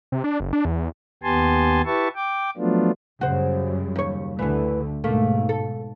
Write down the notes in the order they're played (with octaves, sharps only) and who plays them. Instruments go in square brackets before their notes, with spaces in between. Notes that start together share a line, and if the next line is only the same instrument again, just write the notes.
[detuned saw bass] C3
D4
F#1
D4
E2
[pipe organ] D#2 B3 G4 G#5 A5 C6
E4 G4 B4 E5 A5 C#6
G5 D6
F3 F#3 A3 B3 D4 F4
[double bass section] F#2 C#3 G3 [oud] F#4 C5
[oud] D#2 C#5
[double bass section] D2 D3 A3 [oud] E3 B3
[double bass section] G#2 B2 [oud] A3 A#3
[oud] A4